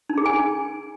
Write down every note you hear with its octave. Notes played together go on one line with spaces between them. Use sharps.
D#4
G#4
G#5
D#4